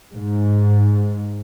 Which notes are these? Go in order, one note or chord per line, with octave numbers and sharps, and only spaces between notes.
G#2